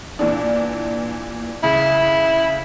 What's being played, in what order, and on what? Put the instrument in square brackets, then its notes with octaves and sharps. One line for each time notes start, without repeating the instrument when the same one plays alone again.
[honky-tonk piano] A#2 E3 D4
[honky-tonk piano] C#3 [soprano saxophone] E4